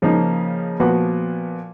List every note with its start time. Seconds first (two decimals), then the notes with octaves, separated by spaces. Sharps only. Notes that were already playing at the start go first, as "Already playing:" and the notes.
0.02 C#3 F3 A#3 D#4
0.80 A#2 F3 B3 F#4 B4